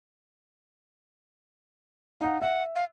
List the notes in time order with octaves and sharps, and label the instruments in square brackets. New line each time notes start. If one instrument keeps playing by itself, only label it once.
[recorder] D#4 [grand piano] F5 F#5
[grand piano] E5 [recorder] F#5
[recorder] F5